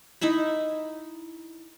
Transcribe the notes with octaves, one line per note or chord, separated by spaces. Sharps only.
D#4 E4 E5 B5